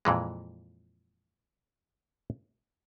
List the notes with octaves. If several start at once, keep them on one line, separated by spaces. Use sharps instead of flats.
F2 A#2 E3 G#3